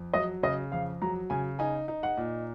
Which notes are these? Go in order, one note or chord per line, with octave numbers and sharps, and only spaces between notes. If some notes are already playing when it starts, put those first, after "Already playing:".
Already playing: F2
F#3 D#5
C#3 D#5
F2 F5
F#3 A#5
C#3 G#5
D#4 G#5
D#4
F#5
A#2